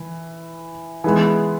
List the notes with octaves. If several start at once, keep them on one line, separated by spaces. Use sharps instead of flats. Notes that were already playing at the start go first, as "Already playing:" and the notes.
Already playing: E3
E3 G#3 B3